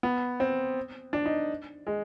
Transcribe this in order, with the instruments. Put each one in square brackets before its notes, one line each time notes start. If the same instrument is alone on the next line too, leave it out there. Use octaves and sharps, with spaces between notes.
[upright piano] B3
C4
D4
D#4
G#3